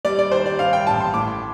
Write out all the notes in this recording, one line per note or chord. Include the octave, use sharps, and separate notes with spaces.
G3 D5
D5
D#3 C5
D5
G2 F5
G5
A1 A5
C6
A2 D6